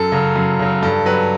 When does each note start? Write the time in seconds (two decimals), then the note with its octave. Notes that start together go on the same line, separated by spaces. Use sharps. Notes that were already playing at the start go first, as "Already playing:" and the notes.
Already playing: F#2 A4
0.12 C#3 F#3
0.35 F#2
0.59 C#3 F#3
0.82 G2 A4
1.05 F#3 B4